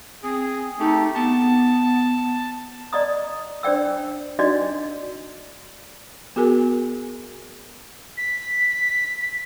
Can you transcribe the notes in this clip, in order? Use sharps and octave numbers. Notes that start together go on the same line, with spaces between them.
C4 G#4
A3 D#4 G4
B3 A5
D5 D#5 A#5 D#6
D4 C5 D5 G5 E6
D4 D#4 F#4 D5 D#5
B3 F#4 G#4 A#4 G#5
B6